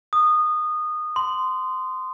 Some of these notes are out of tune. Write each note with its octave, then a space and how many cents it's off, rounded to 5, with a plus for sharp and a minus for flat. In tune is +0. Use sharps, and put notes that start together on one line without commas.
D#6 -20
C6 -20